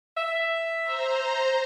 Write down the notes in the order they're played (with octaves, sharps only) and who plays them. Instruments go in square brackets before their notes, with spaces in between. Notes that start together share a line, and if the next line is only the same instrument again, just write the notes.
[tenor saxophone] E5
[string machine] C5 A#5